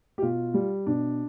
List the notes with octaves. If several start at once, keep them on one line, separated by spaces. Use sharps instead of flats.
G4
B2 F4
G3
B2 D4